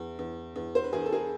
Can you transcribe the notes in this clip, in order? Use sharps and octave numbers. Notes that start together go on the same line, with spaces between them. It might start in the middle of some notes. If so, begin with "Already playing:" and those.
Already playing: E2
E2
E2
C5
B4
E2 G#4 A#4
A4
G#4 A#4